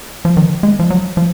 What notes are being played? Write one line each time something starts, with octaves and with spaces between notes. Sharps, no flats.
F3
D#3
G#3
F3
F#3
F3